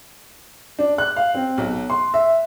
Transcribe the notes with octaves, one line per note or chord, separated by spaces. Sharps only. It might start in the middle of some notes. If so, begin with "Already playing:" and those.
D4
F#6
F5
C4
B1
C6
E5